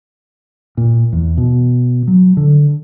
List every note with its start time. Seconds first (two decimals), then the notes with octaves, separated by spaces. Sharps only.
0.77 A#2
1.13 E2
1.37 B2
2.07 F#3
2.37 D3